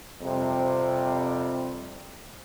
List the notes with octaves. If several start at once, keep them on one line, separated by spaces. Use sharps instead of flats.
F2 C3 G3